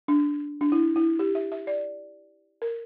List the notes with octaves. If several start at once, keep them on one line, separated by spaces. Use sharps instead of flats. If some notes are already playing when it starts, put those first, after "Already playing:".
D4
D4
E4
E4
G4
E5
E5
D5
A#4